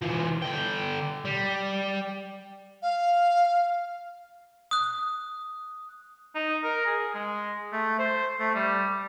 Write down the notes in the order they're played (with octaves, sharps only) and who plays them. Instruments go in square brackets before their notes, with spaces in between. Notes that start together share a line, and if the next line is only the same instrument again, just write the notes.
[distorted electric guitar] E3 F4
D3 G5
G3
[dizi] F5
[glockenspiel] D#6 F#6
[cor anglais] D#4
A#4
G#4
G#3
A3
C5
A3
G3